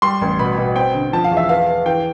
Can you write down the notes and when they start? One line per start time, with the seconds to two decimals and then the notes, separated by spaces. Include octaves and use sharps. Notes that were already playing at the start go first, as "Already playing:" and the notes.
0.02 G3 C6
0.21 A1
0.39 B2 B5
0.58 B2
0.76 C4 G5
0.94 D3
1.13 F3 A5
1.24 F5
1.31 E2
1.37 E5
1.49 B3 F5
1.68 B3
1.86 E3 G5